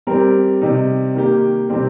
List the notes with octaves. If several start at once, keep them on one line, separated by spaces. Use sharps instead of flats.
G3 C4 G4 A#4
C3 G3 D#4
D#3 A#3 G4
C3 D#3 G3 C4 G4